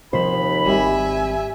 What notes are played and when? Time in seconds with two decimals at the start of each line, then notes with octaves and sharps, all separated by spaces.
0.13 D#2 C3 F3 C5 B5
0.66 G#1 G3 C4 E5 G#5